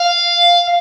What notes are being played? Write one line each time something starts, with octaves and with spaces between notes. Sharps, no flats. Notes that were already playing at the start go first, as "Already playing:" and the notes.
Already playing: F5